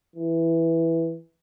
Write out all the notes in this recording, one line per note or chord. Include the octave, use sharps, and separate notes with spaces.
E3